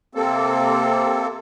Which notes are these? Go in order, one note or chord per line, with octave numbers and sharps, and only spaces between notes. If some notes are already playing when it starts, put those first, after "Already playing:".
C3 A#3 C4 A4